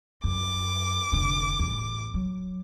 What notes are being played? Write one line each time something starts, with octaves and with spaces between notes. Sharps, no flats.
F#2 D6
F1 D3
A1 E2
F#3